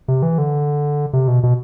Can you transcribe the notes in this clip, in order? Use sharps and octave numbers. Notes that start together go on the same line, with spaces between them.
C3
E3
D3
C3
B2
B2